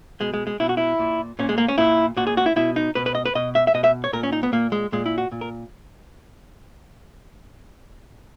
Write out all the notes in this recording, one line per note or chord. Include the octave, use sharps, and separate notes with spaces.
B2 G#3
G#3
G#3
B2 E4
F#4
E4
A#2
A#2 C#4
G#3
A#3
C#4
A#2 E4
A#2 F#4
G#4
F#4
E4
B2 E4
D#4
B2 B4
B4
D#5
B4
B2 D#5
E5
E5
B2 D#5
E5
C#5
A#2 A#4
C#4
D#4
B3
A#2 A#3
G#3
A#2 G#3
E4
F#4
A#2
A#4